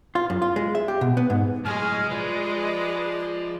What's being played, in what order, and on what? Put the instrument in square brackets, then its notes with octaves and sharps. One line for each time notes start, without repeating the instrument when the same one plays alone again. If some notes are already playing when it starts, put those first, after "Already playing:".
[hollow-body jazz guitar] F4
F#2
F4
G#3
E5
G4
B2
B3
G#2
[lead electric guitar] A2 F#3 [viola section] G#3 [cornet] G#5 [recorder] F6
[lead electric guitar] F3 F4 [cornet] B4 [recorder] D5